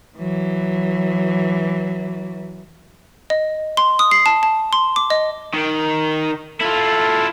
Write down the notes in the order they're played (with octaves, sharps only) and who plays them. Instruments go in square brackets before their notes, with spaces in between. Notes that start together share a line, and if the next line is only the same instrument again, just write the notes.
[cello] E3 F#3
[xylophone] D#5
C6
D#6
C7
A5
A5
C6
D6
D#5
[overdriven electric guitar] D#3
[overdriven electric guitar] E4 F4 [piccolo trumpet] A4